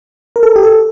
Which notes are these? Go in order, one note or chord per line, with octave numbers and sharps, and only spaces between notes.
A#4
A4
G4
A4